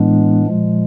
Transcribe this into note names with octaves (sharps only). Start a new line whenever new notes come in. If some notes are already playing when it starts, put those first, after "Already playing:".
Already playing: A2 E3 G#3 B3 D4
A#2 F3 G#3